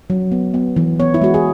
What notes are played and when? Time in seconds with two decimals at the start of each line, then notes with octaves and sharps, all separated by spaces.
0.10 F#3
0.32 B3
0.54 B3
0.76 E3
1.00 B3 C#5
1.14 E4
1.22 G#3 F#4
1.34 G#4